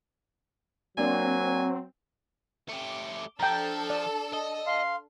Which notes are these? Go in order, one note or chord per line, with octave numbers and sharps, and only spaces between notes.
F#3 A#3 C4 D4 G#5
A3 G4 D6
F3 D4 A4 G5 A#5 E6
D5
D#5
F5 C6